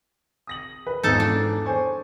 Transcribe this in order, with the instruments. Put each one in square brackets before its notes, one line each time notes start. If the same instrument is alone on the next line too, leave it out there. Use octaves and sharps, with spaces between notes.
[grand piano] D#6 A#6 F#7
B4
[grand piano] E2 G#2 F3 [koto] D#4 A4 A5
[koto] D4
[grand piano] C5 G#5 C#6